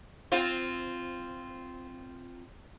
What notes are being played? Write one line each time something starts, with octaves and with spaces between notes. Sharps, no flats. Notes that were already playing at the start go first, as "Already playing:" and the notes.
C4 F4